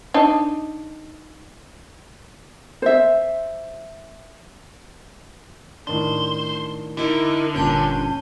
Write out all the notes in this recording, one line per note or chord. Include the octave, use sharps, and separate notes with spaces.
D4 D#4
C5 E5
A2 D#3 D4 C5
D3 D#4 E4 A#4
G1 A#2 C#4 D4 G6 D#7